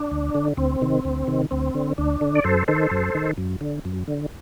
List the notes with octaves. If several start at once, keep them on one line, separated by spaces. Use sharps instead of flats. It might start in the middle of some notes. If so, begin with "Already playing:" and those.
Already playing: D4
D2
D3
D2 C4
C3 D#3
D2
C3 D#3
D2 C4
D3
D2 D4
D3
D5
F#2 A4 C5
D#3 A4 C5
F#2
D#3
F#2
D3
F#2
D3